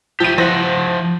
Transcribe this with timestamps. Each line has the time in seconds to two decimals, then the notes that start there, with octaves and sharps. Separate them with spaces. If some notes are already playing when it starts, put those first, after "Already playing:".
0.20 F3 E4 G4 D#7
0.38 F3 E4 C5 F#5 A#6